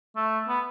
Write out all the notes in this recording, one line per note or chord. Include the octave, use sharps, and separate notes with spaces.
A3
B3